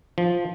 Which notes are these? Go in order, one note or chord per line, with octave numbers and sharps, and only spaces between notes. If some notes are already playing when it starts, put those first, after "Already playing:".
F3